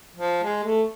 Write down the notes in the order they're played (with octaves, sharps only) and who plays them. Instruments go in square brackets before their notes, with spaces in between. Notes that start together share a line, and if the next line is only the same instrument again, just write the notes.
[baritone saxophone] F3
G#3
A3